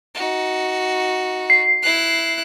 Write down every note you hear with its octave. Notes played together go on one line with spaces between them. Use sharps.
D#4 F#4
C7
E4 F#6